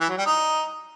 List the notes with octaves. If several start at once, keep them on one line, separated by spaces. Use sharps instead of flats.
E3
F#3
G3
D#4